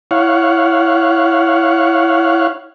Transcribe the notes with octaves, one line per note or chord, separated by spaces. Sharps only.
E4 C#5 F5 F#5